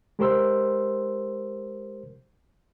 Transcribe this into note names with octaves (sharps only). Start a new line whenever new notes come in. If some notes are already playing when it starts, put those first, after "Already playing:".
G#3 G4 A#4 C5 C6 E6